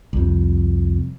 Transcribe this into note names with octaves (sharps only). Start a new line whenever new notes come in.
C2 F2